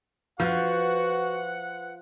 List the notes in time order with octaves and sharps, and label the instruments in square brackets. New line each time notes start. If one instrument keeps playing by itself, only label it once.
[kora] F3 [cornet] F#4 [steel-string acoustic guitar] B4 C5 [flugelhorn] F#5